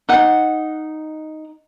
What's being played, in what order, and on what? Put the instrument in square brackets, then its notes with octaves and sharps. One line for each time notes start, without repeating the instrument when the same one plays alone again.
[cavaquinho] D#4 F#5